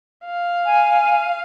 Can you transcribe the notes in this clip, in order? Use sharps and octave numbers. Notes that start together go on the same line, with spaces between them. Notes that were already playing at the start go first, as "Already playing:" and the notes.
F5
G#5